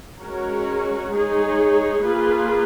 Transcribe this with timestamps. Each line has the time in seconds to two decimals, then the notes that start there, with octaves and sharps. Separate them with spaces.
0.20 G#3 C#4 F#4 A#4 C#5
1.13 G#3 D#4 G#4 C#5
2.05 A#3 F4 G#4 B4